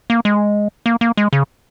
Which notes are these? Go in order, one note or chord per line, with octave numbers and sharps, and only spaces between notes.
A#3
G#3
A#3
A#3
G#3
C#3